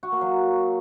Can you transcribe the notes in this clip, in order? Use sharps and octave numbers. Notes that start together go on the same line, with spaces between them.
F#4
A#3
F#3